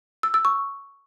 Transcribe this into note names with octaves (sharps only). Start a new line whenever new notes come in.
E6
E6
C#6